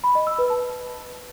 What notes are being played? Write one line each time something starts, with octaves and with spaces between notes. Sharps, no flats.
B5
D#5
E6
B4
A5